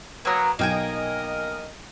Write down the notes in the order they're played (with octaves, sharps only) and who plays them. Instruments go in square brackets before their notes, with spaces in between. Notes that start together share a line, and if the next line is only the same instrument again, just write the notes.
[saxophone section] F#3 B3 [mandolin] A#3 A#4
[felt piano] B1 [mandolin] A#3 G5 G#5 [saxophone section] A#4 D#5